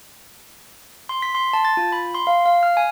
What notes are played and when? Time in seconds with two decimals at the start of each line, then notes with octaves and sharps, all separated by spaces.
1.09 C6
1.22 B6
1.35 C6
1.53 A5
1.65 A6
1.77 F4
1.92 B5
2.14 C6
2.27 F5
2.46 F5
2.63 F6
2.77 G#5